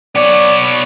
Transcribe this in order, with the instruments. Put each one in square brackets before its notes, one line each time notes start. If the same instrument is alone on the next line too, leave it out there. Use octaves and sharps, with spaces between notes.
[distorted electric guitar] B3 C#5 [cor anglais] D5